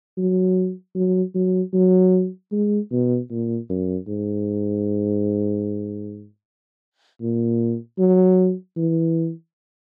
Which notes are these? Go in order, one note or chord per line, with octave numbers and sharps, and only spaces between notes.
F#3
F#3
F#3
F#3
G#3
B2
A#2
F#2
G#2
A#2
F#3
E3